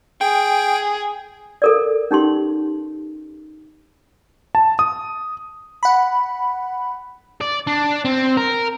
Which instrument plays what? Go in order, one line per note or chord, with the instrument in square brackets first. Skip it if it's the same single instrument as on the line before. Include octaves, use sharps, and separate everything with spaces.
[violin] G#4 [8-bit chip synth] G5
[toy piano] A4 A#4 D5
C#4 D#4 G4 C6
[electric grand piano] A5
D#6
[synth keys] F#5 B5
[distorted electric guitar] D5
D4
C4
A#4